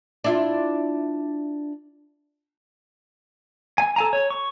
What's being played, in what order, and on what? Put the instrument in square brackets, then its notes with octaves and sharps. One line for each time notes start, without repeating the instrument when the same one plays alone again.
[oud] D4 E4 F4
[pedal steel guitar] G#5
A4 G#5 A#5
C#5
C#6